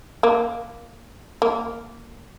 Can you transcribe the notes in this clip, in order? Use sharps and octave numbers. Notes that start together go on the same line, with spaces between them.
A#3
A#3